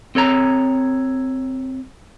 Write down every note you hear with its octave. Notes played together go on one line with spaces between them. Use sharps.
C4 A4 C#5 A#5